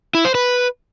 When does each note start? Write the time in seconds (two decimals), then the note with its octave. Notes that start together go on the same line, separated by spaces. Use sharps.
0.15 E4
0.25 C5
0.35 B4